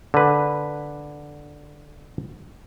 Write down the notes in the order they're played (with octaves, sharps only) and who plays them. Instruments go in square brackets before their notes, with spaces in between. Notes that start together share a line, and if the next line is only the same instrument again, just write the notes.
[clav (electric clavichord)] D3 B4